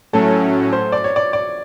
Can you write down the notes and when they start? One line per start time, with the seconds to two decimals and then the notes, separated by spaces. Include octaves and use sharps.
0.13 A2 F#3 A3 C#4 A4
0.73 C5
0.92 D5
1.04 C#5
1.16 D5
1.33 D5